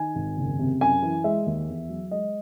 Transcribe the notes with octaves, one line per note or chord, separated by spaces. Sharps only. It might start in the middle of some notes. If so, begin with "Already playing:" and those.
Already playing: D#3 G#5
G#1
F#1
C3
F#2 G#5
E3
G#3 E5
D#2
E2
F#3
G#3 D#5